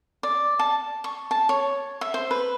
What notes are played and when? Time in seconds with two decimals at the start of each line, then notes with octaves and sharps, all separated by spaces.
0.23 D5
0.59 A5
1.04 C#6
1.31 A5
1.49 C#5
2.01 E5
2.14 C5
2.31 B4